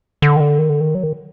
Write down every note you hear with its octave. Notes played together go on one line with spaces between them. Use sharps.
D3
D#3
D3
D#3
D3
D#3
F#3
D#3